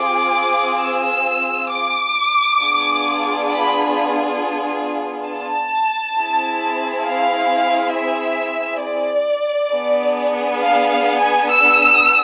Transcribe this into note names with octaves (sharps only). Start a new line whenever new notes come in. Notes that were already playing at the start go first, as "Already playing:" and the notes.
Already playing: C4 F4 G#4 D6
E6
D6
B3 D4 F4 G#4
B5
A5
C4 E4 G#4
F5
E5
D5
B3 D4 G#4
F5
F5
G#5
E6